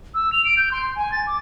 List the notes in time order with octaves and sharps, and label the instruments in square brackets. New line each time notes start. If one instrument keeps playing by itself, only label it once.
[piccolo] E6
F7
D7
G6
C6
G#5
A6
D6